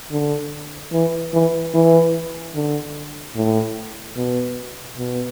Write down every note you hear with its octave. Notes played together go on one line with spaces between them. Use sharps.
D3
E3
E3
E3
D3
A2
B2
B2